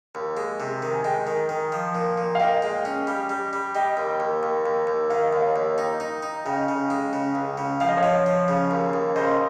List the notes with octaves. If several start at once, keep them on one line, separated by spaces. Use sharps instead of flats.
D#2
G#3
C3
D#3
G#5
G#3 D#5 G5
D#3
D#3
F3
A#2
A#2
F5
A#2 D#5 G5
G#3
C#4
G3
G3
G3
G3 D#5 G5
D#2
D#2
D#2
D#2
D#2
D#3 F5
D#5
D#2 C#5 F5
D#2
D#4 D#5 G5
D#4
D#4
C#3 D#5 G5
C#3
G#3
C#3
C#2
C#3
F3 F5
D#5
C#5 F5
F3
F3
C#3
D#2
D#2
C#3 C5 D#5